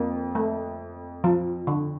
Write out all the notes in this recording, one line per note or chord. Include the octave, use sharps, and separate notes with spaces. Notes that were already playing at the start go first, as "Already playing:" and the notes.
Already playing: F2 A#3
A3
F3
D3